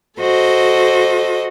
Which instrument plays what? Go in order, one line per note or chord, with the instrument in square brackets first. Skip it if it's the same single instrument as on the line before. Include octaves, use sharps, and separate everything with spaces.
[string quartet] F#4 A4 C5 D#5